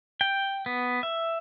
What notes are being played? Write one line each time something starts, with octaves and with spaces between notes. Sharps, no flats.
G5
B3
E5